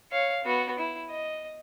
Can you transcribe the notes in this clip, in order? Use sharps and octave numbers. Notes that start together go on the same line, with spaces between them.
C#5 F5
B3 F#4
E4
D#5